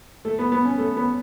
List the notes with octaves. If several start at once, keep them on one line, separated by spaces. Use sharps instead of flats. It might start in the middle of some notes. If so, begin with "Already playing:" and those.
A3
B3
B3
C#4
A3
B3